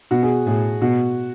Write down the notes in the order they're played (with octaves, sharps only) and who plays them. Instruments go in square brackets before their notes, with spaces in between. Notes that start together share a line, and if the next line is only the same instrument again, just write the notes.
[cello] B2 [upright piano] F#4
[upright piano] G#4
[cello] A2 [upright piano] G#4
[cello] B2 [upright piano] F#4